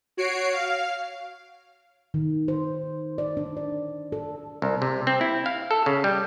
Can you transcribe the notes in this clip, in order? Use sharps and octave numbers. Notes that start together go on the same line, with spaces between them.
F#4 C#5 C7 D7
F5
D#3
C5
D5
D4
D5
A4
C2
C3
C4
E4
F5
A4
C#3
G3